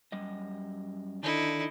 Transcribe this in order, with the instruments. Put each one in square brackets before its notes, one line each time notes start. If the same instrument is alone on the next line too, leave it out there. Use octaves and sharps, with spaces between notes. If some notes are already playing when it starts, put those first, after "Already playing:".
[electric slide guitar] F#2 G3 D#5
[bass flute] D3 [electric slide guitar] D#3 [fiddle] D#4 E4